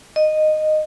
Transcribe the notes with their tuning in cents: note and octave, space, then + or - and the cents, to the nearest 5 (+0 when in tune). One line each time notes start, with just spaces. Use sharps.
D#5 -10